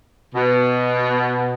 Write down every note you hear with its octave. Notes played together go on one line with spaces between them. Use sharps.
B2